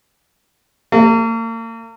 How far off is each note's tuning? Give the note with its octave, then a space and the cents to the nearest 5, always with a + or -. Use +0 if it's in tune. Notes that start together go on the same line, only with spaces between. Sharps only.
A#3 -40